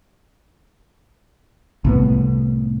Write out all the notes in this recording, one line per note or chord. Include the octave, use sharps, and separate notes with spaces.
C2 A2 B3